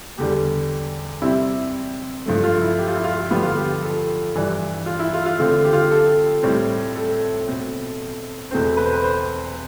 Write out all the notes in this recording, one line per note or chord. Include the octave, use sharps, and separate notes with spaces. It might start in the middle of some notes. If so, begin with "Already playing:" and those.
E2 D3 G3 G4
C3 G3 C4 E4
G2 F3 A3
F4
E4
G4
F4
E4
F4
G2 D3 F3 B3 G4
F4
G4
A4
G2 E3 G3 D4
F4
E4
F4
F4
D3 A3 C4 F4
G4
F4
G4
A4
A2 G3 C4
A4
B2 A3 C4
E2 B2 A3 C4 C5
B4
C5
B4
C5